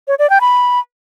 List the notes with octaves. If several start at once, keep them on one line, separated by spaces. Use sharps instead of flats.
C#5
D5
G5
B5